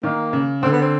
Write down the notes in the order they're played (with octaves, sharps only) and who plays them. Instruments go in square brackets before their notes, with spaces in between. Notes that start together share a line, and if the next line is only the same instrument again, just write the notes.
[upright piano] D#3 [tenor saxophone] A#3
[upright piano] C#3
[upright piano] D3 [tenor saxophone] C4
[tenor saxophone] B3
C4